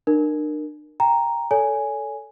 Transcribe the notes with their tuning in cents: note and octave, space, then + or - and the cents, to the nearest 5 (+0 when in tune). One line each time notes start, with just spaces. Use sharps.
D4 +45 A#4 +0
G5 +15 A#5 +0
A4 +0 C#5 +35 G#5 +0